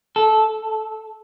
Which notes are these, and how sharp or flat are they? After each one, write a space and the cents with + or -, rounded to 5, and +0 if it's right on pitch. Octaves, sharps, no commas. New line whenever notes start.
A4 -10